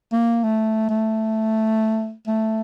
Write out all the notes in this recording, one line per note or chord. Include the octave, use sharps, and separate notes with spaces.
A#3
A3
A3
A3